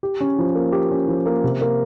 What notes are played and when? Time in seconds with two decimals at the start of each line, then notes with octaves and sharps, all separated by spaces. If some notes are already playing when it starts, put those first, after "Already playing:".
0.03 G4
0.21 C#4
0.38 F3
0.55 A#3
0.72 G4
0.91 C#4
1.08 F3
1.26 A#3
1.44 C3
1.61 A#3